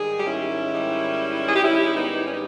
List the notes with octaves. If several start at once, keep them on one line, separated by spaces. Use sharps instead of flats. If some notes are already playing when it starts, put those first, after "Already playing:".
Already playing: G#2 D#3 G3 G#4
G4
C#4 E4
G#2 D#3 G3
G#4
G4
G#2 D#3 G3 C#4 E4
B3 D#4
C#4
D#4